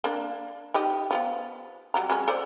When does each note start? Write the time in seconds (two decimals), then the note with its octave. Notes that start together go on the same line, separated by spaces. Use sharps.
0.04 A#3 D4
0.74 D#4 G4 D#5
1.11 F3 G3 B3
1.94 F#3 G3 A#5
2.10 F#3 G#3 C#4
2.28 A4 C5 D5